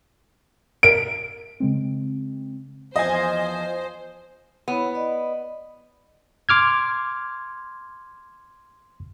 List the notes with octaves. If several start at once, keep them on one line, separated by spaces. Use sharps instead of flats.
A#4 E5 D7
C#3 G#3 C4
E2 F3 C5 D#5 G#5
B3 E4 C#5 B5
D5 D#5
C6 D6 F6 G#6